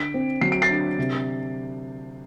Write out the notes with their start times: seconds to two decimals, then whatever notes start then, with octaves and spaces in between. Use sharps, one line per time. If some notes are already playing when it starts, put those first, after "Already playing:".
Already playing: D3 B6 D7
0.14 C4
0.41 F#3 C7
0.52 D7
0.62 A6 C7
0.70 D3
0.98 C3